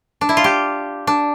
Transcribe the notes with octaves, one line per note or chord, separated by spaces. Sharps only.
D4
E4
F4
G4
D4